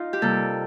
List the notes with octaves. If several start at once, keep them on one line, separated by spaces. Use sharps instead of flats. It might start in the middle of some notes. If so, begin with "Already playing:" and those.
Already playing: D#4 F4
G4
C3 G3 A#3 A4